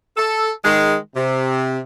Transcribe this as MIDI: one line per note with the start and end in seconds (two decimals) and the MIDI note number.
0.17 0.50 69
0.65 0.96 51
0.65 0.96 56
1.15 1.79 48